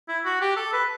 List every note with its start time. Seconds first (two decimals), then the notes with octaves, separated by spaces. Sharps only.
0.08 E4
0.25 F#4
0.41 G4
0.57 A4
0.73 B4